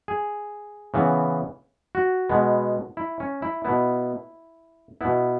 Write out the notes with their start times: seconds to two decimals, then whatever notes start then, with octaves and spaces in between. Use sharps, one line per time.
0.08 G#4
0.94 C#3 E3 B3
1.95 F#4
2.29 B2 G#3 B3
2.97 E4
3.20 C#4
3.42 E4
3.65 B2 B3 E4
5.01 B2 B3 E4